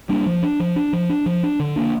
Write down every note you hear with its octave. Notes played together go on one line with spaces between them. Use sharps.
G3 A#3 D4
F3
D4
F3
D4
F3
D4
F3
D4
D3
A#3 D4